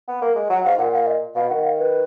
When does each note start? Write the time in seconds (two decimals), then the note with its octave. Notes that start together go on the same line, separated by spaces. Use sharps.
0.08 B3
0.22 A#3
0.35 G#3
0.50 F#3 F#5
0.65 G#2 F5
0.79 A#2 F#5
0.93 F5
1.06 D#5
1.35 B2 F5
1.49 D#3 F#5
1.64 F5
1.78 B4